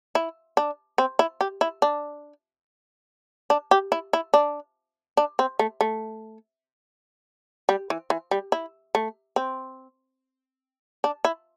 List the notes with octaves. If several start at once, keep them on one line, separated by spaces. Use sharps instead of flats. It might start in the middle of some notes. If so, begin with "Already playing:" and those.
E4
D4
C4
E4
G4
E4
D4
D4
G4
E4
E4
D4
D4
C4
A3
A3
G3
E3
E3
G3
E4
A3
C4
D4
E4